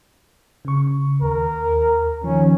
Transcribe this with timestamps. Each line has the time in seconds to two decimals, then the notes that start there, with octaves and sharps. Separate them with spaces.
0.65 C#3 C#6
1.22 D#2 A#4
2.24 D#3 F3 C#4